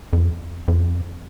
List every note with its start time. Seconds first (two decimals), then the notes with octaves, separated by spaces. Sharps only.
0.13 F2
0.68 F2